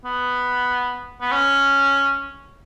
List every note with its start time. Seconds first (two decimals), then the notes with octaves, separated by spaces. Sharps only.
0.05 B3
1.22 B3
1.32 C#4